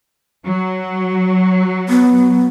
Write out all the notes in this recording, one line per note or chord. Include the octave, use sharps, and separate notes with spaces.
F#3
B3